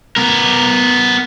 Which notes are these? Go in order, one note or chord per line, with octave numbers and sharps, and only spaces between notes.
B3 A#4